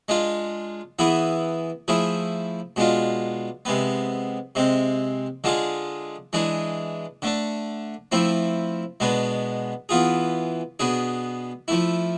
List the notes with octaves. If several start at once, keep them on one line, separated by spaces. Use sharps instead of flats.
G#3 D4 F4
E3 B3 E4 G#4
F3 A3 E4 G#4
B2 G#3 D4 F4
C3 G#3 B3
C3 G#3 C4
D3 G#3 D4 F4 G#4
E3 G#3 D4 G#4
D3 A3 D4
F3 A3 C4 E4
B2 G#3 B3 D4
E3 B3 F4 G#4
B2 B3 D4 G#4
F3 A3 E4